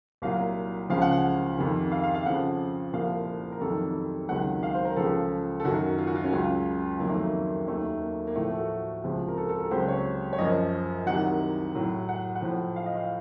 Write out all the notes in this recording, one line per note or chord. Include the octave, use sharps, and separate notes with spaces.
C2 A#2 F#3 F5
C#2 C#3 F3 F5
F#5
F#5
F2 C3 D#3
F5
F5
F5
F2 C#3 F3 F#5
C2 A#2 F3 F5
A#4
F2 C3 D#3 F#3 A4
C#2 C3 D#3 F#3 F#5
F5
C5
A#4
C#2 C#3 F3 A4
A4
F#2 D#3 F#3 F#4
F4
F#4
F4
C#4
C#2 C#3 F#3 F4
F2 D#3 F#3 A#3
A3
A#3
D#2 D#3 F#3 A3
A#3
A#3
A2 F3 A3
A4
F#4
C#2 C3 F3
A#4
A4
A4
A#4
C#2 C3 F#3 C5
C#5
C#5
F#2 F3 D#5
C2 C3 D#3 F#3 F#5
A2 F#3
F#5
F#5
A2 F3
F5
D#5
F5